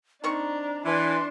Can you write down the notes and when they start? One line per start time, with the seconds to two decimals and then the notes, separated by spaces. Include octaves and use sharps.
0.24 D#3 C4 D4 A#5 C#6
0.85 E3 D4 C6